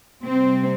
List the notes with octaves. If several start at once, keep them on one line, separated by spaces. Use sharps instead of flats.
C3 G3 C4